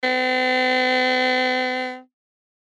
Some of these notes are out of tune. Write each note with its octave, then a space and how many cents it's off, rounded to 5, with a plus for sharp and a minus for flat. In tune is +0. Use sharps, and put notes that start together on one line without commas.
C4 -45